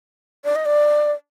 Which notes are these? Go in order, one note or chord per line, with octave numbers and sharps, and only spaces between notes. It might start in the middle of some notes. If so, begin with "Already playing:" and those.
D5
D#5
D5